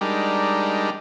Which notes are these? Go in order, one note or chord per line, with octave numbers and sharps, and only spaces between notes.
G3 G#3 D4 D#4 G4 A#4